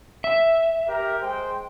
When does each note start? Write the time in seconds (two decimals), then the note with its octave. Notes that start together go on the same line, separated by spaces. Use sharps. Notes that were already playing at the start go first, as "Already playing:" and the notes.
0.24 E5
0.89 G4 A#4
1.22 G#3 C5 G5